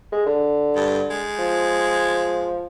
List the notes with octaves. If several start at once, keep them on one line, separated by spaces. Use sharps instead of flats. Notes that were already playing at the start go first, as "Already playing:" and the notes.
G#3
D3
G2
G#3
F3